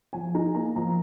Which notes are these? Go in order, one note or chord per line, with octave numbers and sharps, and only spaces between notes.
F3 G#5
D#4 A#5
A#3 A#5
F3 A#5